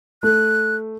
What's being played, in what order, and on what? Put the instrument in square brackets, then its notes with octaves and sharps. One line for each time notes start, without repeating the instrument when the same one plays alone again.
[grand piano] A3 [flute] F#6